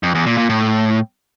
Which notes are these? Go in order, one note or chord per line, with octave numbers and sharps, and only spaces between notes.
F2
E2
A#2
A#2
A2